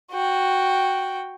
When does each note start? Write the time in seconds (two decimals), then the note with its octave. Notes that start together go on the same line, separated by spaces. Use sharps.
0.12 F#4 G5